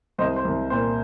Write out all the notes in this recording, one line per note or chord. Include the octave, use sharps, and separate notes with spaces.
C2 C5 D#5
C5
C2
A#2 C5